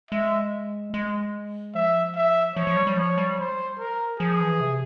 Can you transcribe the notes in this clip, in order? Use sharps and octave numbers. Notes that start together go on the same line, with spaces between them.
G#3 E5
G#3
F3 E5
E5
F3 C#5
F3
G3
G3
F3 C#5
G3
C5
A#4
F3 G#4
E3
C3